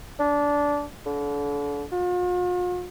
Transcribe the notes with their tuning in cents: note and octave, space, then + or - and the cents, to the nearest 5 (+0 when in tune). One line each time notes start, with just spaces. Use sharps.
D4 -15
D3 -35
F4 +45